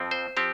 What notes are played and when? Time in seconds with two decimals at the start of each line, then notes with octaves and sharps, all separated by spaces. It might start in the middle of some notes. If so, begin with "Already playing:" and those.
Already playing: F2 F3 C4
0.11 C5
0.37 F3 C4 G4